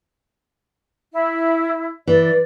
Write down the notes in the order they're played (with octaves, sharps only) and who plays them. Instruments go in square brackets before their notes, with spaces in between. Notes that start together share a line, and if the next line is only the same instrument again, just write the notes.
[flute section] E4
[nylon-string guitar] E3 [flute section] D5